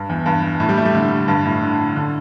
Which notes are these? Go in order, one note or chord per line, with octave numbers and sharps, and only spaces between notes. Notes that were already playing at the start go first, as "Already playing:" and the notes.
Already playing: G2
E2
G2
A2
G3
A3
G3
D3
G2
A2
D3
D3